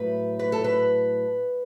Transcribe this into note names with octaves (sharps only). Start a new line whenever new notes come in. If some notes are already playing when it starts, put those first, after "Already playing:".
Already playing: A2 F#3 B4
B4
A4
B4